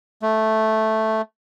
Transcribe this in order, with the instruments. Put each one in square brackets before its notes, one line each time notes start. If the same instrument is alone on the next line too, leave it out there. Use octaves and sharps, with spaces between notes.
[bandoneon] A3